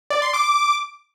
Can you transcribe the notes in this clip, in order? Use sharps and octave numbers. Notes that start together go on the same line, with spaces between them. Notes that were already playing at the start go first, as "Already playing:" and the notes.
D5
C6
D6